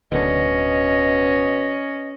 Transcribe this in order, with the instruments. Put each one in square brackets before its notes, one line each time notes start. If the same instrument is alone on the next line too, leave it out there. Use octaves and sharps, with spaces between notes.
[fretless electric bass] D1 D3 [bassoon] B2 [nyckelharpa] C#4 [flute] D#5